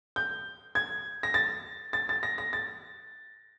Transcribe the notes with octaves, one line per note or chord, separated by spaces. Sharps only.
G6
G#6
A#6
A6
A6
A6
A#6
A#6
A6